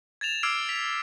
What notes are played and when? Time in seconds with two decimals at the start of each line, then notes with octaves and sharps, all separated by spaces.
0.21 G#6 A6 E7 F7
0.43 D6 E6 F6 G#6 C7 D7
0.69 B6 F7